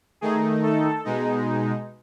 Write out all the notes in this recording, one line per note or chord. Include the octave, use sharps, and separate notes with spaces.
D#3 A3 D#4 G#4
A4
B2 G#3 D#4